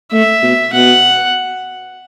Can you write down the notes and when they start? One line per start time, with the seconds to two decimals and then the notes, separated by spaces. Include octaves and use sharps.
0.12 A3 E5
0.43 B2
0.73 B2 F#5